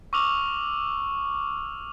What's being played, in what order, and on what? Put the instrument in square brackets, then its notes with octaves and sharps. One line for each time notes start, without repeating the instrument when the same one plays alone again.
[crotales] C#6 D6 E6 F6 F7 F#7